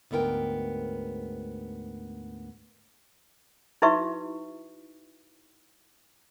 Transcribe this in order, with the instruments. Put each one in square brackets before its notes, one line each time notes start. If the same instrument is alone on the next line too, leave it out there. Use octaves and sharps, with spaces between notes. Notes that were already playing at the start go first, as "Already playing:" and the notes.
[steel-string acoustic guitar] D2 G#2 B3 A#4 G5
[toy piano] D#4 E4 F#4 B4 E5 C#6